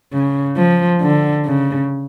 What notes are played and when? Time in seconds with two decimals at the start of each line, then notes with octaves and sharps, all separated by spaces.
0.12 C#3
0.56 F3
1.01 D3
1.44 C#3